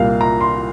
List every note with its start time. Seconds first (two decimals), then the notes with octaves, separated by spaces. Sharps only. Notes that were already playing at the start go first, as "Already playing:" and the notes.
Already playing: C2 A#2 G3 A#3 F5
0.21 A#5
0.41 C6